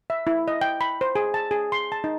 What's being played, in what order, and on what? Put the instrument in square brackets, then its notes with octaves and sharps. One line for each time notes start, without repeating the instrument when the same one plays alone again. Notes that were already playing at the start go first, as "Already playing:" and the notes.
[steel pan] E5
E4
D#5
G5
B5
C5
G#4
A5
G#4
C6
A5
D#4